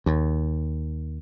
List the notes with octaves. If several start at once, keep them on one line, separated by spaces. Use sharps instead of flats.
D#2